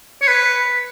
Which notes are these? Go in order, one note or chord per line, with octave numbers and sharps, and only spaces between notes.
C#5
B4